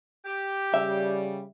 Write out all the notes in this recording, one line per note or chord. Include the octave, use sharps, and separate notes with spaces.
G4
C#3 G3 E5